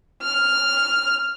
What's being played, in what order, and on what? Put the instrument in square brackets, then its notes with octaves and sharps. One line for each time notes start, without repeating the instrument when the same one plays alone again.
[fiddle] F6